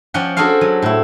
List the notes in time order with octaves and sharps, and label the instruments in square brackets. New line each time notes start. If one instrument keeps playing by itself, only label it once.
[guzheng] F3 C#4 D5 F#5 G5
D4 F#4 G#4 A4 C5 F5
F#3
A2 E4